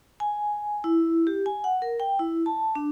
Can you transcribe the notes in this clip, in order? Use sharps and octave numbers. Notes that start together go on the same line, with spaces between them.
G#5
E4
G4
G#5
F#5
A#4
G5
E4
A5
D4